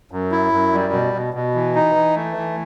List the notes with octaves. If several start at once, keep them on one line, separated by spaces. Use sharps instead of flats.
F#2
E4
F#2
G3
B2
B2
B2
E3
D#4
E3
A3
E3